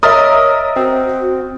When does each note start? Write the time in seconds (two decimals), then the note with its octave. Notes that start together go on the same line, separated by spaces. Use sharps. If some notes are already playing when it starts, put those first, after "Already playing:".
0.03 A#4 C#5 D#5 E5 D#6 F6 A6
0.76 C4 F#4